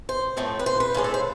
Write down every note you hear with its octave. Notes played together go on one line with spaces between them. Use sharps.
C5
A2 F3 A3 C4
B4
C5
B4
A2 G#3 D4 F4
A4
C5